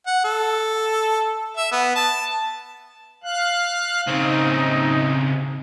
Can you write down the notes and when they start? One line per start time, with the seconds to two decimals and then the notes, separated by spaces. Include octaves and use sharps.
0.06 F#5
0.24 A4
1.57 E5
1.72 B3
1.96 A5
3.24 F5 F#6
4.08 C#3 C4 D#4